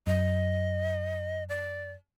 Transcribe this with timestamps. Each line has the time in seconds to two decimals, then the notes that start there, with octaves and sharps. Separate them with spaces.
0.07 F#2 D#5
1.49 D5